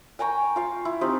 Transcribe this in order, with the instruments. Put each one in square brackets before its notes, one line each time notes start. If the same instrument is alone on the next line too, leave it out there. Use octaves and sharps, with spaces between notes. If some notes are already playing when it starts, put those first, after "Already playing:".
[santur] G5 G#5 A#5 C#6
F4 F5
E4
C4 D#4 F4 G4